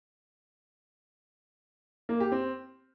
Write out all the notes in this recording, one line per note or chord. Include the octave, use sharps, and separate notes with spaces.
A#3
G4
C4